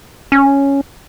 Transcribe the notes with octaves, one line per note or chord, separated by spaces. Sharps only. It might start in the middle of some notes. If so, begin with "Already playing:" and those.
C#4